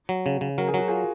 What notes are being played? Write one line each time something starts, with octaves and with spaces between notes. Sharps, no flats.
F#3
C#3
C#3
F#3 A#4
G#4
F#3 F#4
F4 G#4